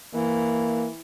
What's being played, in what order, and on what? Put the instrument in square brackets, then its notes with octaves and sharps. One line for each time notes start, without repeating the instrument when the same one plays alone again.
[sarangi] E3 [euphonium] A#3